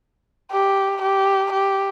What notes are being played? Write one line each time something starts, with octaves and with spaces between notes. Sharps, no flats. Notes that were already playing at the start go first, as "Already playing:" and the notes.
G4
G4
G4